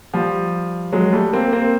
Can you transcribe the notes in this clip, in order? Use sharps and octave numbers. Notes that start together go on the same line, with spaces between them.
F3 G3
F#3 G#3
G3 A3
A#3 C4
A#3 C4